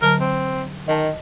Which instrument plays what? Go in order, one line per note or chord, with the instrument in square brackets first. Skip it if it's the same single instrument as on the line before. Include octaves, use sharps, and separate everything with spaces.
[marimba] D3 F#3 A5 [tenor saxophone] A#4
[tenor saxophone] C4
[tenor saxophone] D#3 [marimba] D#5 A5